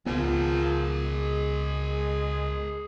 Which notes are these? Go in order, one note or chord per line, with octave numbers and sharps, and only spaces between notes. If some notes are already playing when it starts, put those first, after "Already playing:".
C#2 F3 B3 G#4 A#4
G#3